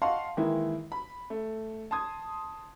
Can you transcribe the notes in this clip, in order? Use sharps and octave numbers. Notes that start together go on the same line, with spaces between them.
D#5 F5 F#5 A5 C6 C#6
D#3 E3 G#3 A#3 E4
B5
A3
A5 C6 D#6 G#6